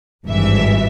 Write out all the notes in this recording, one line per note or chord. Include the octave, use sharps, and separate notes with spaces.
G#1 G2 E3 E5